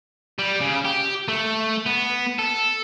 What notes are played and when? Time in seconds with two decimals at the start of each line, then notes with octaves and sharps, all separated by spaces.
0.39 G3
0.60 C#3
0.85 G4
1.28 A3
1.86 B3
2.39 A4